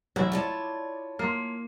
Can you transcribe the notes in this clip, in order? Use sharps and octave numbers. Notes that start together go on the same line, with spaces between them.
A1 F#3 E4 E5
F4 C#5 D5 A5
A#3 C6 F6